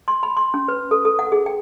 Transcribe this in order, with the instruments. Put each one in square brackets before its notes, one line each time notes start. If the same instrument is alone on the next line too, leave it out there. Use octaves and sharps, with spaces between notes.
[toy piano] C6
B5
C6
C#4
B4
A4
A4
F#5
G#4
G5